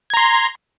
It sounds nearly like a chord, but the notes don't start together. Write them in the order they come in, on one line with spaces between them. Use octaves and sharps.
G#6 A#5 C6